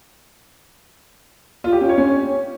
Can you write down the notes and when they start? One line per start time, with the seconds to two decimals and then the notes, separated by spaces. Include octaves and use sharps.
1.64 F4
1.73 G4
1.81 C#4
1.89 C#5
1.98 C#4